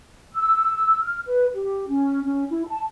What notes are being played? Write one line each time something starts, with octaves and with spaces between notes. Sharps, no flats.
E6
F6
B4
G4
C#4
C#4
E4
A5